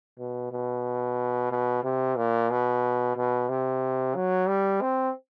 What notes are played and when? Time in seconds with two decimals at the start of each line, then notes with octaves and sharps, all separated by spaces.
0.18 B2
0.52 B2
1.51 B2
1.84 C3
2.16 A#2
2.50 B2
3.16 B2
3.49 C3
4.15 F#3
4.48 G3
4.81 C4